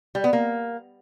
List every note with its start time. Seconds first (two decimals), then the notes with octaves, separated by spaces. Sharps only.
0.15 G3
0.24 B3
0.33 A#3